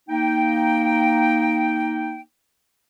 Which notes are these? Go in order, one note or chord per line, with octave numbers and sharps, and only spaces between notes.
A#3 D#4 G5